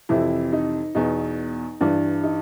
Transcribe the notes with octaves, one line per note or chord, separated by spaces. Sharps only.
F2 C3 E3 E4
D#4
E2 B2 D#4
G2 E3 D4
D#4